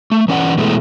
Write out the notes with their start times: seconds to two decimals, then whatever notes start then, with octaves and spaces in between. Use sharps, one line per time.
0.11 A3
0.28 E3 C#4 B4 D5 F#5
0.58 B2 E3 G#3 A3